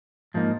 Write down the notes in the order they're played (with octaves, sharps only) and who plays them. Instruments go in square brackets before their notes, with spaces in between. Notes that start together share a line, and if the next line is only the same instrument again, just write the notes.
[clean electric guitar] G#2 F3 A#3 D#4